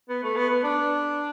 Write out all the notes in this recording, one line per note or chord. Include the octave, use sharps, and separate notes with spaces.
B3
A3
B3
B3
D4